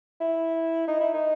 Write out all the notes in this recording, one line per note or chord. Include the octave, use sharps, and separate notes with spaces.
E4
D#4
E4
D#4